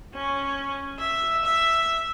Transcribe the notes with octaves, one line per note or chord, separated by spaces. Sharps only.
C#4
E5
E5